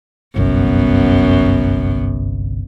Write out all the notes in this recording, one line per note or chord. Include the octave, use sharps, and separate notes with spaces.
G1 C2 F#2 B3